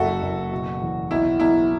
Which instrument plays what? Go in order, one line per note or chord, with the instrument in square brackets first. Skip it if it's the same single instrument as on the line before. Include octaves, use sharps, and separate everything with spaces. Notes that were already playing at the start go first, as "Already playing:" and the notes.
Already playing: [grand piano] F#1 F#3 [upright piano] F#4 A4 E5
[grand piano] F#1
B2
E2
[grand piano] B1 [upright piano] E4
[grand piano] B1 [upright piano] E4